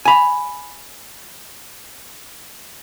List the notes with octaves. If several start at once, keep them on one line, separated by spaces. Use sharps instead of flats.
G#5 B5